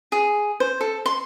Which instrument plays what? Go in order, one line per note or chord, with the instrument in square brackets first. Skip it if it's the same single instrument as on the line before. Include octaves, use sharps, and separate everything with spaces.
[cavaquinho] G#4
C5
A4
C6